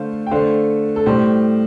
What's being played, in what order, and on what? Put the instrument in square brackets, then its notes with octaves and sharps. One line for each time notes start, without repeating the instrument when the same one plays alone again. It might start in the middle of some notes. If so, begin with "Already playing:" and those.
Already playing: [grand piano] D3 A3 C5 F5
G5
D3 A3 C5 F5
A4
A2 G3 G4 C5